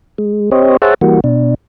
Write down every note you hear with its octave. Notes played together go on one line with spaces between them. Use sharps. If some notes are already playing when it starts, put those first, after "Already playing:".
G#3
C4 G4 C5 C#5 D#5
G#4 C5 C#5 E5 F#5 A5
E3 G3 A#3 F#4
B2 D4